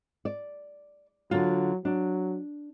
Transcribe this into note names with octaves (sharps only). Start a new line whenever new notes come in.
D5
D3 F#3 F4
F#3 D4